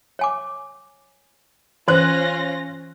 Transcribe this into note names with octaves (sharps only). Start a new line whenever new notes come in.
C#5 G#5 D6
E3 C#4 F4 C5 F#6 A#6